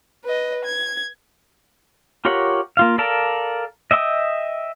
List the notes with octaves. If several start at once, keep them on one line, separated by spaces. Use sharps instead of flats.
B4 D#5
G#6
F4 G4 A#4 C#5 F#5
A#3 F4 F5
A4 A#4 D5 F5 A5
D#5 E5 G5 D6 D#6